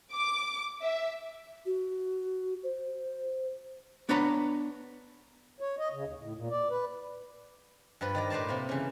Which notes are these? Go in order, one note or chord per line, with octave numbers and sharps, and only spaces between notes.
D6
E5
F#4
C5
B3 D4 B4 C#5 A#5 B5
C#5
D#5
C#3
D#2
A2
A#2
D5
B4
G2 F3 B4 B5
D#3 D5 A#5
A2 B4 C5 D5 A5
C3 A#3
C#3 E3